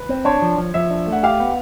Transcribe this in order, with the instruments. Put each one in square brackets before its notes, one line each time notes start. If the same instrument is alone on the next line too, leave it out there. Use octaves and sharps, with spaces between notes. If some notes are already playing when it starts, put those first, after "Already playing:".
Already playing: [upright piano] B4
[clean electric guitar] C4
[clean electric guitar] D4 [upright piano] C#5
[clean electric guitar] F3
F3
[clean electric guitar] F3 [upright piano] E5
[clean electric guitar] D4
A3
[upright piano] F#5
[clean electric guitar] G4 [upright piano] F5
[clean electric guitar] B3